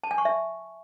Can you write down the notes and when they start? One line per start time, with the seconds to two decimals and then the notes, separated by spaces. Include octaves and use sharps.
0.04 A5
0.11 G#5
0.18 C#6
0.25 E5